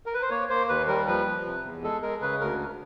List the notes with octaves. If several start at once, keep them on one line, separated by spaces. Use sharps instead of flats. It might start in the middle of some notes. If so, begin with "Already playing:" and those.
A#4
B4
C5
A#3 C#5
A#3 C5
D#2 B4
G3 A#4
F3 B4
F3
C3
E2
G#3 A4
G#3 A#4
C#3 B4
D2 A#4